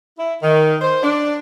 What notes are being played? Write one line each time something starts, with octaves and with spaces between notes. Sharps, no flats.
E4
D#3
C5
D4